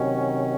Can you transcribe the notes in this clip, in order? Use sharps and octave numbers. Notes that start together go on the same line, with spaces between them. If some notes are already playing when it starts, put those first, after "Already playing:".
Already playing: C3 D#3 F#3 C#4